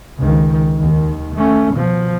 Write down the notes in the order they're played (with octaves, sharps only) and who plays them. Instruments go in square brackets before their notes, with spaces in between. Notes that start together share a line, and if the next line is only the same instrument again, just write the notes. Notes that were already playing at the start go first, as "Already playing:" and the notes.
[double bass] C#2 D#3
D#2 D#3
A3 C#4
B2 F3